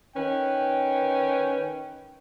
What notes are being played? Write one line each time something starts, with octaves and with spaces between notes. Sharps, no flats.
D#3 C#4 B4 G5